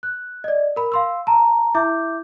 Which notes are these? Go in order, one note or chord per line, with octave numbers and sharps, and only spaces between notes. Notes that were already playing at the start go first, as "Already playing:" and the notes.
F#6
D5 D#5
A#4 B5
F5 C6 E6
A5 A#5
E4 E5 D6 G6